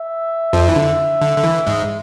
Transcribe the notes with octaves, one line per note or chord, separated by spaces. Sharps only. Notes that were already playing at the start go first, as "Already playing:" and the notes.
Already playing: E5
F2 F3
E3
D3
D3
D3
E3
G#2 G#3